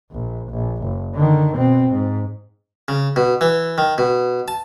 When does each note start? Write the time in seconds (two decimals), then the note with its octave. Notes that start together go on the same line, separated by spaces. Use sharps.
0.12 A#1
0.50 A#1
0.83 F#1
1.15 D3 D#3
1.55 B2 C4
1.92 G#2
2.88 C#3
3.16 B2
3.41 E3
3.78 D#3
3.98 B2
4.48 A5